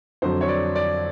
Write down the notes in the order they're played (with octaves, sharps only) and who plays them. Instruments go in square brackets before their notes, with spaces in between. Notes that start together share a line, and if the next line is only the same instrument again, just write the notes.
[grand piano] F2 D3 F#3 C5
C#5
D5
D5